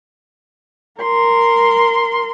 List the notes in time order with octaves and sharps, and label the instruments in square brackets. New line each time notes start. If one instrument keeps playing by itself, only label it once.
[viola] A#4 C6